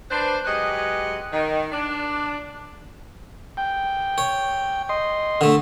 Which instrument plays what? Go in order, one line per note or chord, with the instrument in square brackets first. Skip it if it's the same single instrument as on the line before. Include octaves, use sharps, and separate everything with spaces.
[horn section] D4 B4 C5
F#3 G#3 G4 B4 C#5 D#5
D#3
D4
[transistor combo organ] G5
[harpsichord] C#5
[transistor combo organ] D#5 C6
[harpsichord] D3 A3